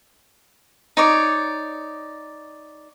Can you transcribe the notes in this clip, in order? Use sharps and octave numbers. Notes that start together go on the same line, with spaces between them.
D#4 C#5 D5